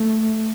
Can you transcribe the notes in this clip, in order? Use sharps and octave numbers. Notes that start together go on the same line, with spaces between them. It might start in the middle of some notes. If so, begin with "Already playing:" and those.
Already playing: A3